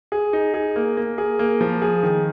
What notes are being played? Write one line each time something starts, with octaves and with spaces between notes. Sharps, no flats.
G#4
D#4
G#4
A#3
A#3
G#4
A#3
F3
G#4
D#3